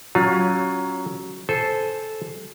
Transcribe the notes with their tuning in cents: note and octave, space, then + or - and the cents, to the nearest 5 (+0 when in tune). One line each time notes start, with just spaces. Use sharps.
F#3 +15 C#4 +0 F4 +25
A4 -10 C5 +0 G#5 +0